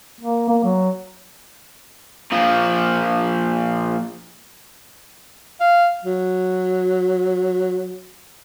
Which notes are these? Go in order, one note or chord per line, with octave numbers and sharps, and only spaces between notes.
A#3
A#3
F#3
A#2 F3
F5
F#3